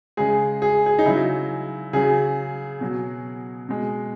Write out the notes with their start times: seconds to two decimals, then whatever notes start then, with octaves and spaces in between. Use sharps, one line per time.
0.17 C#3 G#3 G#4
0.62 G#4
0.86 G#4
0.99 D#4
1.05 C#3 F#3 E4
1.93 C#3 F#3 G#4
2.81 B2 F#3
3.69 B2 G#3